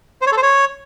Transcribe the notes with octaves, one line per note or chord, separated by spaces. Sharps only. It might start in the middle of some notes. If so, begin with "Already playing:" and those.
C5
C#5
A4
C5
C#5